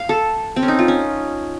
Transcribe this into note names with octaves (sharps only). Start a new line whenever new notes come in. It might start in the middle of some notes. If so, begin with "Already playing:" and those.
Already playing: F5
A4
C4
C#4
D#4
F4
C#4